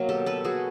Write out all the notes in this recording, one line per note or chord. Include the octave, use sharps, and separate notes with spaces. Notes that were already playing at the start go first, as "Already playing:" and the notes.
Already playing: B2 F#3 A#3
G4 A4
A4 B4
F#4 G#4